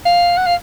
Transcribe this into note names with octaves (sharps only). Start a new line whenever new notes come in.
F5
F#5
F5